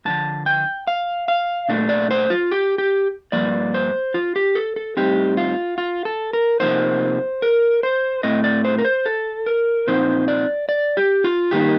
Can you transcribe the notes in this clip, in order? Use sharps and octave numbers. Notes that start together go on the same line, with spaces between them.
G2 D3 F3 A5
G5
F5
F5
A#2 A3 D4
D5
C5
F4
G4
G4
G2 F3 A#3 D5
C5
F4
G4
A4
A4
A2 G3 C4 D#4 G4
F4
F4
A4
A#4
C3 F3 A#3 D#4 C5
A#4
C5
A2 A3 C4 D#5
D5
C5
A#4
C5
A4
A#4
A#2 F3 C4 D#4 C5
D5
D5
G4
F4
G2 D#3 A#3 D#4 G4